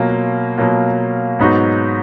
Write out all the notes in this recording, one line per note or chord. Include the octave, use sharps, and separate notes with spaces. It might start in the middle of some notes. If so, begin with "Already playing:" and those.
Already playing: B2 F#3 A#3 F4
B2 F#3 A#3 F4
G#2 F#3 B3 D#4 F#4